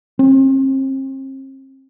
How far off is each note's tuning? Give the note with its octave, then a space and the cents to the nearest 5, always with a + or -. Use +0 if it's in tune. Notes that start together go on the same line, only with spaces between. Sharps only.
C4 +40